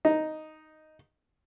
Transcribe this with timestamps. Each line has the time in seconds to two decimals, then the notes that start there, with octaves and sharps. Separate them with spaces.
0.05 D#4